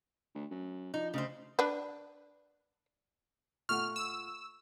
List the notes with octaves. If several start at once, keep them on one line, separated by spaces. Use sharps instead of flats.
D2
F#2
F3 D#4
D2 C#3 C4 C5
D4 B4
A#2 A3 F#5 C#6 F6
E6